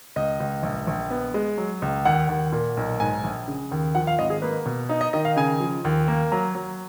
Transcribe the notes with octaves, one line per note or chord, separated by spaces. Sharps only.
C#2 D#5
C#2
A#1
A#1
B3
G#3
F#3
C#2
D#2 F#5
D#2
A#2
B1
G#2 G#5
A#1
C#3
D#2
F3 F#5
F5
G#1 D#5
G#4
A#3 B4
B2
D#4
D#5
D#3 D#5
F5
C#3 G#5
F3
D#2
A#3
F#3 A#5
F#3